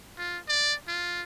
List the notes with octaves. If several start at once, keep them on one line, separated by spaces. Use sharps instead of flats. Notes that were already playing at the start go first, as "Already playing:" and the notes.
F4
D5
F4